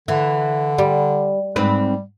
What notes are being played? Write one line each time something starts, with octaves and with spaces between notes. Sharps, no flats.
D3 E3
G3
G#2 G3 C4 B4